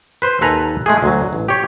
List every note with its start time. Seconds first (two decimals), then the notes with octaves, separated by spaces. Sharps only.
0.22 B4 C5
0.41 D#2 A4 B4 G#5 A#5
0.86 G#3 A3 G#4
1.02 D2 F#3
1.33 A1
1.48 G4 C#5